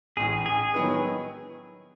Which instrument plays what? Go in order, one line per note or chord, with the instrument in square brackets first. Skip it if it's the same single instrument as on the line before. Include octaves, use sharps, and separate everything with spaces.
[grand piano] A1 A2 E3 [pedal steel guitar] G#4
[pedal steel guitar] G#4
[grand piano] D#3 F#3 B3 E4 B4